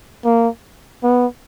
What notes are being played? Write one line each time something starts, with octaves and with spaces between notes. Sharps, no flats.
A#3
B3